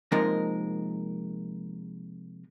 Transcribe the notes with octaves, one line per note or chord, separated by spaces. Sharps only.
C3 F3 G#3 A#3 D#4 A#4